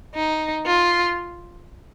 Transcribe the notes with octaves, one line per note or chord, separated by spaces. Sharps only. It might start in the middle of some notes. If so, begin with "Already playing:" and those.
D#4
F4